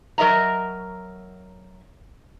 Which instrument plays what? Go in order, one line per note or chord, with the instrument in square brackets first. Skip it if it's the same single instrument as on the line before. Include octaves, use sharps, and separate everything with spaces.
[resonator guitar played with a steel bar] F#3 A#4 D#5 E5 A#5